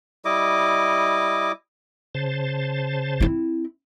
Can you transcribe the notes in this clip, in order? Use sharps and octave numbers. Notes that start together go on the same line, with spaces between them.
G3 E4 D#5 D6
C#3 C5 A5
C4 E4